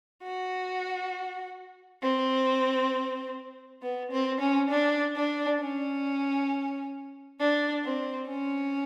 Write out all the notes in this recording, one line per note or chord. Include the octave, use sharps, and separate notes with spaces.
F#4
C4
B3
C4
C#4
D4
D4
C#4
D4
C4
C#4